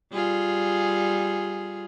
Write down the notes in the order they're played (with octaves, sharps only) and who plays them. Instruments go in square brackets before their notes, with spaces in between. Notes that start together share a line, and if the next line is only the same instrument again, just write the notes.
[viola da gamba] G3 F4 G#4